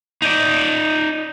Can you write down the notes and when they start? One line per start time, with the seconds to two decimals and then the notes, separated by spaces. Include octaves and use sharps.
0.22 D#4 D5